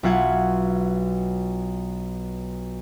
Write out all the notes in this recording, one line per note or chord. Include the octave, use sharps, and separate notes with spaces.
B1 F4 E5 F#5 G#6 E7